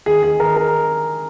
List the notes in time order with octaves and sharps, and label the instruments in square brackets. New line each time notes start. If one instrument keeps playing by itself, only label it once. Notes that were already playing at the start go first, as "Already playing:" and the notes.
[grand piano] D#3 G#4
D#3 G#4
D#3 A#4
A#4